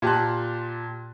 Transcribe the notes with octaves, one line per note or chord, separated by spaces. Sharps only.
A#2 G4 A5 C6 F#6